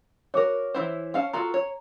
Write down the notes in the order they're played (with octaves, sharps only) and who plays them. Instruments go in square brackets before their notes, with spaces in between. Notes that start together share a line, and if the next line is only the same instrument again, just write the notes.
[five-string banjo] F#4 A#4 [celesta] C#5 D6
[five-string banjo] E3 E4 C5
C#4 F5 A5
[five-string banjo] F4 F#4 A4 [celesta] A#5
[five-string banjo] C#5